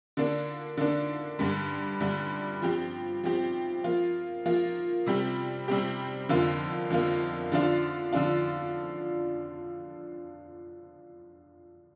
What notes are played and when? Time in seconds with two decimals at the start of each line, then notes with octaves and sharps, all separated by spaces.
0.17 D3 A#3 D4
0.77 D3 A#3 D4
1.39 G2 D3 G3
2.00 G2 D3 G3
2.62 F3 C4 G4
3.24 F3 C4 G4
3.84 F3 A#3 F4
4.46 F3 A#3 F4
5.06 C3 G3 C4 G4
5.68 C3 G3 C4 G4
6.29 F2 D3 A#3 F4
6.90 F2 D3 A#3 F4
7.52 D3 F3 D4 F4
8.13 D3 F3 D4 F4